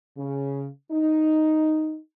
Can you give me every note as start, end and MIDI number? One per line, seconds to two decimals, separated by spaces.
0.16 0.66 49
0.92 1.98 63